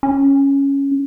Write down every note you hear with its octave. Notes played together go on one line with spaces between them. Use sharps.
C#4